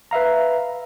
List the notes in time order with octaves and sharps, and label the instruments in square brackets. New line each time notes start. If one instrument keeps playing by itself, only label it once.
[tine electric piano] B4 E5 F5 A#5